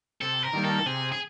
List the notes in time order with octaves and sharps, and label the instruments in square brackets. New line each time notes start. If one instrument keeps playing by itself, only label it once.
[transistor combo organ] C3 [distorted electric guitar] A4
[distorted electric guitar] A#4
[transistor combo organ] D#3 G3 A#3
[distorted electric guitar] A4
[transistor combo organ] C3 [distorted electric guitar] G#4
[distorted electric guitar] G#4